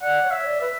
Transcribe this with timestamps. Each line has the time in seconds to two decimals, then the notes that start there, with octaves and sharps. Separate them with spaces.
0.02 D5 F#5
0.23 C#5
0.31 E5
0.46 D5
0.60 B4 E5